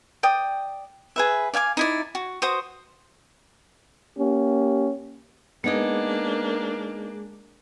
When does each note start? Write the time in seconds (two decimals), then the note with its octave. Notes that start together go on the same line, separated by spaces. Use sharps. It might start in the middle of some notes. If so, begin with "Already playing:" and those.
0.23 D5 G5 D#6
1.16 G#4 B4 E5
1.54 D5 F5 G#5 D6
1.77 D#4 E4 D5
2.15 F#4
2.42 F#4 C5 D#6
4.18 A#3 C#4 G4
5.64 G#3 A#3 B3 D4 D#4 G#4 D#5